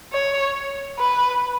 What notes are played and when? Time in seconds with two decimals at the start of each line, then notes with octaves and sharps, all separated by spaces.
0.13 C#5
0.99 B4